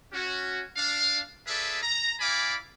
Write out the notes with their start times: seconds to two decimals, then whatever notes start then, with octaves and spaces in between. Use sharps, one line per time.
0.13 C#4 F#4
0.76 D4 F5
1.47 F4 G#4 A4 B4 D5 E5
1.83 A#5
2.19 E4 D5 F5 G#5 B5 D6